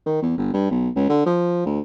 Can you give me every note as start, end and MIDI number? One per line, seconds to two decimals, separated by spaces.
0.06 0.19 51
0.22 0.34 40
0.38 0.49 31
0.53 0.68 43
0.71 0.89 35
0.96 1.06 37
1.09 1.25 50
1.26 1.64 53
1.66 1.80 38